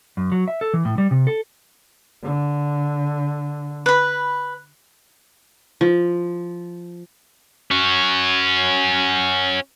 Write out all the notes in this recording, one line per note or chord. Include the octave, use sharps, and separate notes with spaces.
F#2
F#3
E5
A4
E3
A2
G3
C3
A4
D3
B4 B5
F3
C#4 F#4